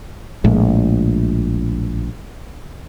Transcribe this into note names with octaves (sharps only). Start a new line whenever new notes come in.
A#1 A2 G#3